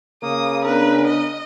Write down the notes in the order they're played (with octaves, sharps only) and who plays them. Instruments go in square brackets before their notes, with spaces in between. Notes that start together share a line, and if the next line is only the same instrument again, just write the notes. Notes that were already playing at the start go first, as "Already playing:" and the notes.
[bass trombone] C#3 [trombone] A#3 [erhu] D#6
[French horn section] B3 D4 [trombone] A#4 [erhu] B4
[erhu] D#5